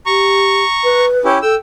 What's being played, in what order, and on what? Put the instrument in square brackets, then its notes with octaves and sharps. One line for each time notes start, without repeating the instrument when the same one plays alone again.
[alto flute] G4 [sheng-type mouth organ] A#5 C#6
[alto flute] B4
[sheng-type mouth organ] C#4 E4 G4
[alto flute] A4 [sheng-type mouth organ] G5 E6